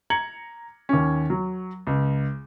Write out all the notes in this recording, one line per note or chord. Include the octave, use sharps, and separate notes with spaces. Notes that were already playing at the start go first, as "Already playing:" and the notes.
A#5 G#6 C#7 F#7
D#2 C#4
F#3
C#2